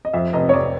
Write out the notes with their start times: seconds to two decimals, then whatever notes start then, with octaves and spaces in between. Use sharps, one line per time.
0.05 D#5
0.13 F2 E5
0.33 F1 D#5
0.49 C#5
0.53 F1 D5